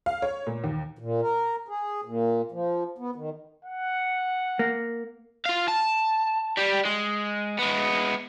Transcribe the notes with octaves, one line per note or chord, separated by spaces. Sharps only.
F5
C#5
A#2
D#2
A#2
A#4
G#4
A#2
F3
B3
D#3
F#5
A#3
F4 F5
A5
G3 G4
G#3
G#3 B3